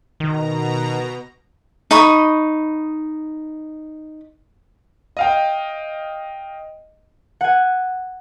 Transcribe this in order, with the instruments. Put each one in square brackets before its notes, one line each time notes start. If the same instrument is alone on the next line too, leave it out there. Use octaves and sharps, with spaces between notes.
[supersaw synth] B2 A#5 [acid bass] D#3
[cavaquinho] D#4 B5 C#6 D#6
[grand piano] D#5 F5 G5
[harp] F#5 G#5